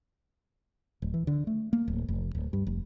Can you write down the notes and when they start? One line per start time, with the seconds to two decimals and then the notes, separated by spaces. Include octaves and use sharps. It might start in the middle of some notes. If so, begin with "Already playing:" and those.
1.02 D1
1.14 E3
1.27 D3
1.47 A3
1.73 A#3
1.88 D1
2.08 F1
2.35 D1
2.53 G2
2.67 F1